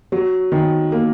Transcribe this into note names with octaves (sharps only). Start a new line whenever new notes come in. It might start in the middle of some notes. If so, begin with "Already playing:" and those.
F#3
D#3
A#3